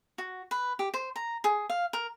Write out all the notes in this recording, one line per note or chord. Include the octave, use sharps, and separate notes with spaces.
F#4
B4
G4
C5
A#5
G#4
F5
A#4